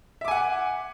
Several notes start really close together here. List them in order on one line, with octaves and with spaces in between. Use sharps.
E5 D6 G#5 F#5